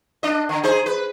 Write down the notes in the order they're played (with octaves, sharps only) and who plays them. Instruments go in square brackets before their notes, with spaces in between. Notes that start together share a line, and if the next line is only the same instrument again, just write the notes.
[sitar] D4 D#5
D3
D#4 G#4 C5
B4